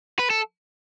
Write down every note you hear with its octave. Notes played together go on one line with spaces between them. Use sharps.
B4
A4